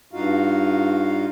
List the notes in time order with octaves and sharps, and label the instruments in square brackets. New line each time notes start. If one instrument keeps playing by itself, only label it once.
[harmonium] G2 D#4 F4 F#4 F5